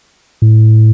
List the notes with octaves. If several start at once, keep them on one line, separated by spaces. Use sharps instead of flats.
A2